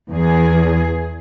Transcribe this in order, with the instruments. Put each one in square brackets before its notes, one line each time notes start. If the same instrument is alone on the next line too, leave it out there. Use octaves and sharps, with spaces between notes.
[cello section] E2 G#4